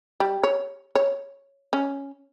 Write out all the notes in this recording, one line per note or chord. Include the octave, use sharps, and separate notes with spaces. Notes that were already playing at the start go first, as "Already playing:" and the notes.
G3
C#5
C#5
C#4